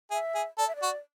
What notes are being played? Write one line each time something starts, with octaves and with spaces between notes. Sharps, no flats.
G#4 E5
G#4
A4 D5
E5
D5
F#4